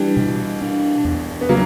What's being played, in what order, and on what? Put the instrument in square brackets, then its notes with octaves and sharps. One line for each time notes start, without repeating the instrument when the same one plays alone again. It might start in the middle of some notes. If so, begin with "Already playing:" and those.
Already playing: [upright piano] E3 G3 [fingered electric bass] D4
[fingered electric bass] B2
D4
E2
[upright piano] B3
[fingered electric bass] C#3 [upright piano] F#3 A#3